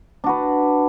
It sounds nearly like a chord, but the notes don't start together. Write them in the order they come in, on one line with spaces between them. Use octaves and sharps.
D4 F#4 B4